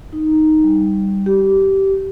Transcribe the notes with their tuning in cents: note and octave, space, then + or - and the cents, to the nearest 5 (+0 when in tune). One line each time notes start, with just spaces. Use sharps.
D#4 +0
G3 +0
G4 -15